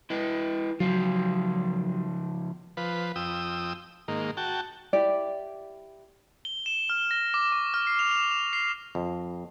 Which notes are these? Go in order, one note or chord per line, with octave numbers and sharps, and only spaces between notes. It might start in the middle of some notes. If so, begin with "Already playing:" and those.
E4 B4 D#5
C#3 F3 F#3 F4
F3 B4
F2 G5 D#6 E6
G#2 D#3 A#3
F#4 G5 A5
E4 G4 D5
G7
E7
F6
A#6
D6
C#6
F6
C7
F7
F7
F7
C7
F2